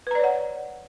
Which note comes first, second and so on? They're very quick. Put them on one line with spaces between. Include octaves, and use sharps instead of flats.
B4 A#5 D5 C#5 F#5